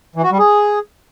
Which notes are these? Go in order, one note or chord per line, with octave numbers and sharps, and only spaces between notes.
E3
F#4
G3
G#4